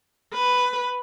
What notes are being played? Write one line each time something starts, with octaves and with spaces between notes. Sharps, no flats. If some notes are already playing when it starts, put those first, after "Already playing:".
B4